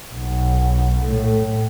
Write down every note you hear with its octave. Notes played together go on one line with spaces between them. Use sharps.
B1
A2 A3